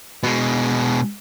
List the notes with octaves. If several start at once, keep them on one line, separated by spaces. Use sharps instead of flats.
B2 G#3